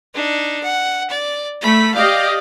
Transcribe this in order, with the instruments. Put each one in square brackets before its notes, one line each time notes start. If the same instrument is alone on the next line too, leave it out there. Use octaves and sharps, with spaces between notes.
[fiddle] D4 D#4
F#5
D5
[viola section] A3 [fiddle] B5
[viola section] G4 D#5 F5 [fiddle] D5